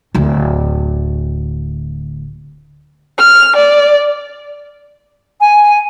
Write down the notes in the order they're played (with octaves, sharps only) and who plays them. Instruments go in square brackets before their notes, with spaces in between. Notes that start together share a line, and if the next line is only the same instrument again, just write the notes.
[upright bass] D1 D2
[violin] F6
D5
[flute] G#5